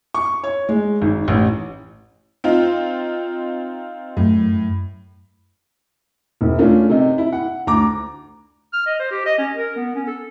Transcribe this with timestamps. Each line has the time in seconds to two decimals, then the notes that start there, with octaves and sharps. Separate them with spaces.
0.14 C#6
0.44 C#5
0.69 G#3
1.02 G#1
1.28 A1
2.44 C4 D#4 F4
4.17 F#2 A2
6.41 E1
6.58 A3 C#4 D4 F4 A#4
6.90 C3 D#4
7.18 E4
7.32 F#5
7.67 D2 A#5 D6
8.73 F6
8.86 D#5
8.99 C5
9.11 G4
9.26 D#5
9.38 C#4
9.54 A#4
9.76 B3
9.95 C#4
10.07 A4